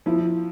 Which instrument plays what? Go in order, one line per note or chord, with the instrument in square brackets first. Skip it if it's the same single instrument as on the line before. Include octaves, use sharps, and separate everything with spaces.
[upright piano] F3 [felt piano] E4